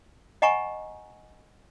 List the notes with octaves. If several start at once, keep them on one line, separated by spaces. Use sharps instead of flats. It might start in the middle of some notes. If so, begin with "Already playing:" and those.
D#5 F#5 G#5 A#5 C#6